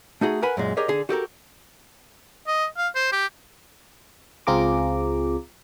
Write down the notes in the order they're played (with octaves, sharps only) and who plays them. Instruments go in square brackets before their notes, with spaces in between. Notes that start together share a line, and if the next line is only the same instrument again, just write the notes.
[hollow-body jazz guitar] A3 D#4 F#4 G#4
A#4 B4 F#5 G#5 B5
F#2 A#2 G#3
G4 G#4 A#4 C#5 D#5
D3 G#4
F#4 G4 A4 A#4
[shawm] D#5
F5
C5
G4
[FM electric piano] C#2 C4 F4 G#4 A#5 D6